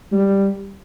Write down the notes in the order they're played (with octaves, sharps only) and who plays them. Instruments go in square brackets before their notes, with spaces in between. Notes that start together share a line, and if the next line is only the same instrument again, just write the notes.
[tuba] G3